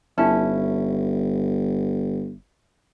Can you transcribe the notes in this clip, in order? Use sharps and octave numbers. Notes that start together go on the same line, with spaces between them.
G1 C#4 E4 A5